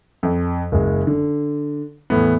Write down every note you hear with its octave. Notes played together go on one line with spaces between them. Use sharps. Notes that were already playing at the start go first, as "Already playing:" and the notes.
F2
F#1 G#3
D3
E2 A2 B3